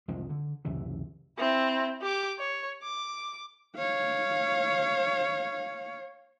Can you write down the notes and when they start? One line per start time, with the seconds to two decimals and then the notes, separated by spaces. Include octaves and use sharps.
0.08 C2 F2 F3 G#3
0.29 D3
0.65 C#2 F#2 C3 E3
1.38 C4 E4
2.02 G4 D6
2.38 C#5
2.83 D6
3.76 C#5 F5